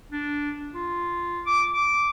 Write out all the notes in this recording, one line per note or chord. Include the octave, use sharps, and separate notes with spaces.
D4
F4
D6
D6